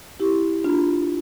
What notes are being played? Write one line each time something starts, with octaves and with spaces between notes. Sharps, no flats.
E4 G4
D4 F4